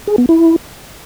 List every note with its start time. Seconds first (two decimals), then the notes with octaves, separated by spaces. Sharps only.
0.07 G#4
0.18 B3
0.29 E4